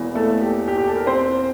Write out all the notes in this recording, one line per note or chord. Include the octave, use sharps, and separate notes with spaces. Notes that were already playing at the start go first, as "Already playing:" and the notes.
Already playing: E1 E2 E3 A#3
A3 A4
G4
G4
G4
A4
A#4
C4 C5